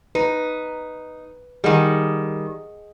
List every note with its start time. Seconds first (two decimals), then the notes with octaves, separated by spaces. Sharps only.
0.15 D#4 B4
1.64 D#3 G3 G#4 D#5 F#5